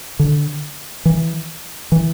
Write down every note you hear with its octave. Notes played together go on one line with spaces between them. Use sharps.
D3
E3
E3